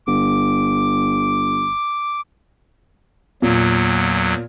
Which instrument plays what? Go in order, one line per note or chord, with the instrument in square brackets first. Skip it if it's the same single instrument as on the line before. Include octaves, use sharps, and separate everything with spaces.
[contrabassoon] G1 [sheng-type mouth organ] D6
[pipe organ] E2 F#3 [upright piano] A#2